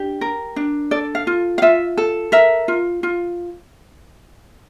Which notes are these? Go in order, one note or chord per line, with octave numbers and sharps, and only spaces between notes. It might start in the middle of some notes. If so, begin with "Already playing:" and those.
Already playing: D4 G4
A#4
D4
A4 D5
F5
F4
F5
F4 E5
A4
A#4 E5
F4
F4